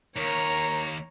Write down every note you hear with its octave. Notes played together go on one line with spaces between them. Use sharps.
D#2 A#4 C#5 A#5